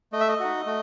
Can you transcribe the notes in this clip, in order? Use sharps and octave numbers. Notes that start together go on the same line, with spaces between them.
A3 D#5
E5
D#5
D#4 F#4
A3